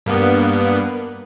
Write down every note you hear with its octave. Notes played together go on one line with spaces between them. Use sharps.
G2 A#3 B3